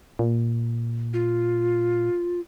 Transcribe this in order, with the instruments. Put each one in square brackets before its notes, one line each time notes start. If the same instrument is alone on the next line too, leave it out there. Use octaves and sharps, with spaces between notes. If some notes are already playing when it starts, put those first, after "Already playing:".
[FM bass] A#2
[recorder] F4